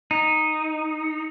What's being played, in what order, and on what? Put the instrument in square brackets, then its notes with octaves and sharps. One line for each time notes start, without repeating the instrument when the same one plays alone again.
[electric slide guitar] D#4